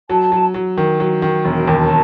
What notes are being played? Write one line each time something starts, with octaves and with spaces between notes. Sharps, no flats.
F#3 A5
F#3
F#3
D#3
F#3
D#3
E1 G5
D#2
A5